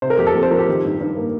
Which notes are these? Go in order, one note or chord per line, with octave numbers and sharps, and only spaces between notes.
C3 C5
A#4
F2 G4
A4
F2
C5
F3 A#4
G4
D#3
G2
G2
A#3